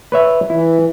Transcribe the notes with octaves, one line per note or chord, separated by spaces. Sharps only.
B4 C#5 E5
E3 E4